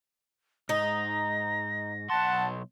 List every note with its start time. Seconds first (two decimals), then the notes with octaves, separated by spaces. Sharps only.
0.69 G#2 D#4 A#6
2.10 B1 F#5 A5 C6